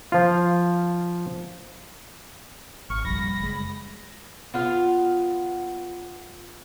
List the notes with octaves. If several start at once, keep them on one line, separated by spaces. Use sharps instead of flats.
F3 F4
G#1 C#6 F6
A#1 F2 F3 G3 B5 A#6
F#1 G#3
B3 F4 F5